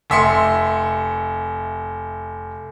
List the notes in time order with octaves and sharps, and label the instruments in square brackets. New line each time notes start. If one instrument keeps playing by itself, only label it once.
[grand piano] F1 E5 C6 C#7